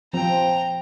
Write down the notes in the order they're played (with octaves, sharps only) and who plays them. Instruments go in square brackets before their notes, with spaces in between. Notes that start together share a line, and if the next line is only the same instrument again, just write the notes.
[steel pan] F3 C4 [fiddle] G5 A#5